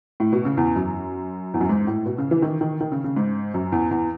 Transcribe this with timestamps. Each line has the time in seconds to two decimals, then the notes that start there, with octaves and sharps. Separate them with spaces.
0.20 A2
0.32 B2
0.45 C#3
0.57 E2
0.76 F#2
1.54 E2
1.61 F#2
1.69 G#2
1.87 A2
2.06 B2
2.18 C#3
2.31 E3
2.42 D#3
2.61 D#3
2.81 D#3
2.92 C#3
3.04 C#3
3.16 G#2
3.54 F#2
3.72 E2
3.91 E2